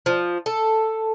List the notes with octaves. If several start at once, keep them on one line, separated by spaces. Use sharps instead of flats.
F3
A4